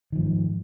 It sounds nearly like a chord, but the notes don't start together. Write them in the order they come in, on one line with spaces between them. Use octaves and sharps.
D#3 F3 G#2